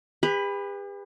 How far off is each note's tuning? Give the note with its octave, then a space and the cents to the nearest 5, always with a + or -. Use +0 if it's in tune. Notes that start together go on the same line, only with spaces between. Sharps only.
G4 +45 B4 +0